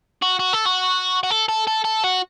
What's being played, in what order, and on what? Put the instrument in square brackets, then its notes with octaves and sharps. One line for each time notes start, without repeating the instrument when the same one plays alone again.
[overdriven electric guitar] F#4
F#4
A4
F#4
F#4
A4
A4
A4
A4
F#4